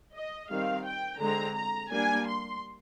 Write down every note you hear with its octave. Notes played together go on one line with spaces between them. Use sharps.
D#5
D#3 G3 C4 F5
G5
D3 G#3 C4 A#5
A#5
G3 A#3 D4 G#5
C6